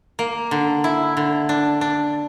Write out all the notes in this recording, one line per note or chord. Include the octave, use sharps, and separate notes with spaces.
A#3
D3
E4
D3
D4
D4